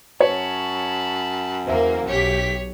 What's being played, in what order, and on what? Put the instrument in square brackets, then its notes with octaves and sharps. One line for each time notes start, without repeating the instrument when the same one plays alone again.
[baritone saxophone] F#2 [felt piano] C#5 [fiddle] A5 B5
[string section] E2 A#3 [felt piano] C5 E5
[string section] B1 G4 B6 [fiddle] C#5